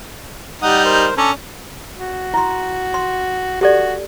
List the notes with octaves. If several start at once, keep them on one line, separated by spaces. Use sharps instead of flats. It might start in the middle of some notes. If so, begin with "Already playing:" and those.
G3 D#4 F#5 D#6
A#4 C5
C#4 D4 A4 A#5
F#4
E4 C6
C6
F#4 G4 A4 D5